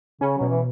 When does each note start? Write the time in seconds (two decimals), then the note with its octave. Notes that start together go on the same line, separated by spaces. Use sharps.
0.21 C#3 C#4
0.38 B2 F#3
0.49 E3